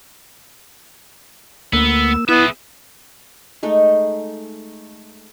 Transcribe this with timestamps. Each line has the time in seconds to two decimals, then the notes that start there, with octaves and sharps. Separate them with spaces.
1.73 D2 A#3 B3 E6
2.29 B3 E4 G#4 E5
3.63 G#3 A3 D#4